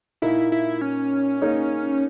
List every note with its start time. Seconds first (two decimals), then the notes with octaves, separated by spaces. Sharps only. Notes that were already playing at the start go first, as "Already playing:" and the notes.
0.22 A#2 A#3 D#4 E4
0.52 E4
0.81 C#4
1.42 A#3 D#4 G#4 C#5